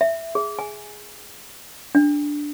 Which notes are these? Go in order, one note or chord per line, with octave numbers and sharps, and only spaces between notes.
E5
G#4
G#5
D4